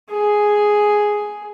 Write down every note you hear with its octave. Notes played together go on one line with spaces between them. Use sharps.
G#4